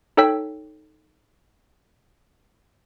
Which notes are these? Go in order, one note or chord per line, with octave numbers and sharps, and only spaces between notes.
D#4 A4 C#5 G5 E6 B6